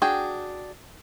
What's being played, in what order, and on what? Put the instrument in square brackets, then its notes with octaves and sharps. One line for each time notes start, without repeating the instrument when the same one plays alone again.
[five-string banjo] D4 F#4 G#4 G5